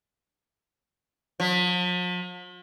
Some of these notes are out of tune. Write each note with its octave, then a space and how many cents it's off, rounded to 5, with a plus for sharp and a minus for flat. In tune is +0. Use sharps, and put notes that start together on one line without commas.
F3 +45